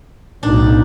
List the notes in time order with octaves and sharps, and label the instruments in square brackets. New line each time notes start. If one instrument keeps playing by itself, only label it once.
[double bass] B1 A2 [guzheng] D4 [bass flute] D#4